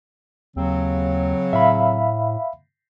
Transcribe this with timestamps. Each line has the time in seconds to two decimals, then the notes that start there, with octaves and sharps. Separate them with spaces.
0.56 D#2 C#3 F#3 C4
1.53 A2 E5 F5 B5